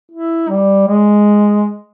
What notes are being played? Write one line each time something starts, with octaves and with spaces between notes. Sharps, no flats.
E4
G3
G#3